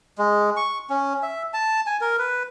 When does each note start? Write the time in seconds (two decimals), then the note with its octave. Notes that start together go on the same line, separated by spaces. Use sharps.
0.18 G#3
0.56 C#6
0.90 C#4
1.23 E5
1.53 A5
1.87 G#5
2.01 A#4
2.19 B4